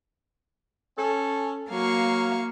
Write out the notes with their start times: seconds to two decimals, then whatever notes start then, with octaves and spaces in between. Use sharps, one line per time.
0.98 C#4 A4
1.70 F#3 A#3 F5 C#6